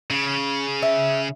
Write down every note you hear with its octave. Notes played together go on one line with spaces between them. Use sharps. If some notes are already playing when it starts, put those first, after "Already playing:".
C#3
E5